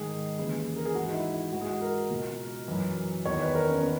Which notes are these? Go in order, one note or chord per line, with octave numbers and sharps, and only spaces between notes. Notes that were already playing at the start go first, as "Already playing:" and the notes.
Already playing: G#2 D#3 G#4
D#2 C#3 E3
A#4
G#4
G#2 E3 F#4
D#4
E4
E4
G#2 E3 F#4
G#4
F#4
A#4
C#2 B2
F#2 E3
E2 D#3 C#5
B4
A#4
C#4
D#3 B3